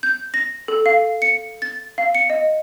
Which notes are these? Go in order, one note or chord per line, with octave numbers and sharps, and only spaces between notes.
G6
A#6
A4
F5
C#7
A6
F5
C#7
D#5